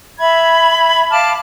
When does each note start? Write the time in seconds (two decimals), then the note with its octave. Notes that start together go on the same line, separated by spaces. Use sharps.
0.18 E5 B5 G#6
1.11 F5 A5 D6 F6